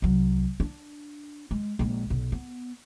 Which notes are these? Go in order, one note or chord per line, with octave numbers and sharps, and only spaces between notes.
C2 F#3
D4
G#3
A#1 G#3
B1
B3